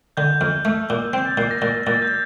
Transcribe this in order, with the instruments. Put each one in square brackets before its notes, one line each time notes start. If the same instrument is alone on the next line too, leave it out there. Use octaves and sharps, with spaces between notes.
[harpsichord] D3 [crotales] G6
[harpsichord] F2 [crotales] F6
[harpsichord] A3 [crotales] E6
[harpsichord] A#2 [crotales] D6
[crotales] E6
[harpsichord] C4 [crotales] G6
[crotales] A6
[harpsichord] A#2 [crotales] C7
[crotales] A#6
[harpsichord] A#2 [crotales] A6
[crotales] A#6
[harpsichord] A#2 [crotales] A6
[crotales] G6